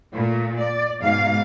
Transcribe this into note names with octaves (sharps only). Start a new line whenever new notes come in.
A#2 A3
D5
G#2 B2 F5